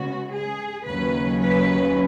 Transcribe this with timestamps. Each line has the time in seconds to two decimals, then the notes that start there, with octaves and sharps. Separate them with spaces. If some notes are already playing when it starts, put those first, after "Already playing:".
Already playing: C#3 G#3 B3 F#4
0.34 G#4
0.87 D#2 C#3 F#3 C#4 B4
1.40 B4